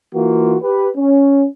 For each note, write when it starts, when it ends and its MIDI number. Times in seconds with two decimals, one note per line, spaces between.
0.15 0.57 52
0.15 0.57 58
0.15 0.57 65
0.15 0.57 66
0.62 0.89 67
0.62 0.89 71
0.97 1.46 61